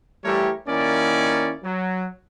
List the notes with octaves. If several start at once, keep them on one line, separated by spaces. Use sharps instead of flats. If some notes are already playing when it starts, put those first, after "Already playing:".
E3 G3 A3 G4 A#4 C#5
D#3 A#3 C#4 E4 D5
F#3